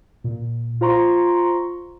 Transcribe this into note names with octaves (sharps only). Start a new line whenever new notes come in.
A#2
F4 C5 A#5 C6 C#6